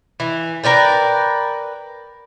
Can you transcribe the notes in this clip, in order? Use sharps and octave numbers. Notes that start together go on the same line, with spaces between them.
E3
A#4 B4 D5 G5